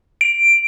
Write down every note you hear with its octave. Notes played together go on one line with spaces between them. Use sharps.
D7